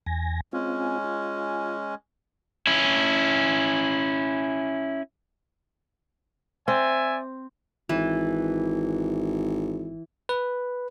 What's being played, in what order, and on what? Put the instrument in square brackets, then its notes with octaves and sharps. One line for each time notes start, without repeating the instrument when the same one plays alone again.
[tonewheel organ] E2 G#5 A#6
[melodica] G#3 C#4 [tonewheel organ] C4 F4
[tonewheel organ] F4
[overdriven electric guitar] C#4 E4
[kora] C4 [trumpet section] D5 E5 G#5
[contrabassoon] G#1 [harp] E3
[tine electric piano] B4